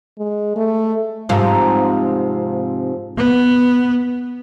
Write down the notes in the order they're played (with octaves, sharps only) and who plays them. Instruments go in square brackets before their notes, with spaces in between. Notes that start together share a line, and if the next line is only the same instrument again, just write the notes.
[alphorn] G#3
A3
[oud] G#2 C3 [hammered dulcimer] F3 A#5
[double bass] B3